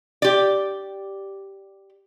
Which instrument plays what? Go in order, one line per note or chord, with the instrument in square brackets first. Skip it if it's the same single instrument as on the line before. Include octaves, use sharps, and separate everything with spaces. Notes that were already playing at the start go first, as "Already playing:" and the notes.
[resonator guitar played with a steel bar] G4 D5